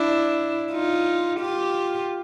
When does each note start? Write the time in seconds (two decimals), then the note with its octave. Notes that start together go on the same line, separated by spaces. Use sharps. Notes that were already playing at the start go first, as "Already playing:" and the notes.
Already playing: D4 E4
0.72 D#4 F4
1.40 F4 G4